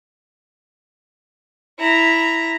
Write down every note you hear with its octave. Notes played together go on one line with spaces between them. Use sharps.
E4 A#5